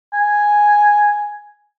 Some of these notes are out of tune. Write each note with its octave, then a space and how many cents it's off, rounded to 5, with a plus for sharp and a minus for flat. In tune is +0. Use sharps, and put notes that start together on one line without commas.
G#5 +0